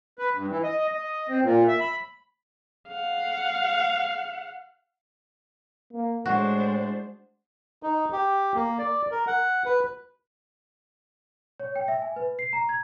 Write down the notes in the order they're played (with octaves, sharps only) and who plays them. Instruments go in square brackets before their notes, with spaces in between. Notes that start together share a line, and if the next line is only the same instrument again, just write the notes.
[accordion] B4
G2
E3
D#5
D#5
C4
A#2
E5
B5
[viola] F5 F#5
[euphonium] A#3
[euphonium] A2 [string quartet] G#3 D4 C5 [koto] F#4
[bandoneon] D#4
G4
A#3
D5
A#4
F#5
B4
[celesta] C#5
G5
E5
G#5
B4
C7
A#5
G#6